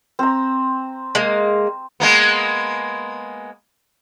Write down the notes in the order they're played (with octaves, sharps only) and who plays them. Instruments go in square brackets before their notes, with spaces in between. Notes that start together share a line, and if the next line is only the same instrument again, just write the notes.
[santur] C4 A#5
[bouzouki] G#3 A#3
[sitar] G#3 A#3 B3